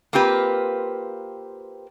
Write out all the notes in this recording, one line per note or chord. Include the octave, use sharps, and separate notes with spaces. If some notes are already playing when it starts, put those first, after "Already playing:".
A#3 C4 F4 G4 B4